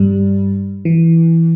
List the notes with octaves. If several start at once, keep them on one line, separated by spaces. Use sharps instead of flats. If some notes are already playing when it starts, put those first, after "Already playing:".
Already playing: G2 G3
E3